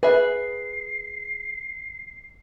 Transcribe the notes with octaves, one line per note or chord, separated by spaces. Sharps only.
G#4 B4 E5 C7